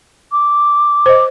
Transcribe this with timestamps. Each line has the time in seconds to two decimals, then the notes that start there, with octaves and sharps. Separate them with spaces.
0.32 D6
1.06 C5 D#5